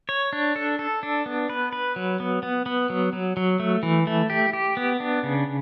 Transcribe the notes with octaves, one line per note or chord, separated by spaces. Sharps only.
C#5
D4
A4
A4
D4
B3
B4
B4
F#3
B3
B3
B3
F#3
F#3
F#3
A3
E3
A3
G4
G4
B3
D4
C#3